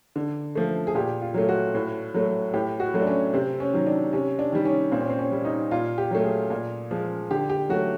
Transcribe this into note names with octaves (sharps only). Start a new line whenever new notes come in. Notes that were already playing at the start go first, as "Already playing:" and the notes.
D3
F3 A3
G#4
A#2 G4
F4
F#3 A3
F#4
A2
F#3 A3
A2 G4
F#4
F#3 A3
D4
C#4
C3 C4
C#4
D#3 F#3
D4
C3 C#4
D4
D#3 G3
C#4
A#2 C4
C#4
C4
C#4
G3
D#4
A#2 F4
G4
F#3 A3
G#4
A#2
F3 G#3
D3 G4
G4
F#3 A3 F#4